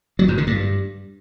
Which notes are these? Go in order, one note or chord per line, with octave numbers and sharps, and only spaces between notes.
F#3
G#2
D3
G2